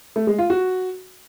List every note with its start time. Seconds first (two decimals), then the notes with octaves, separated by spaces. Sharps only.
0.16 A3
0.27 G#3
0.38 F4
0.50 F#4